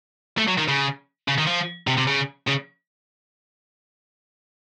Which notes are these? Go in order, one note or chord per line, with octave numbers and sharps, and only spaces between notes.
A3
F#3
D#3
C#3
C#3
D#3
F3
C3
C3
C#3
C#3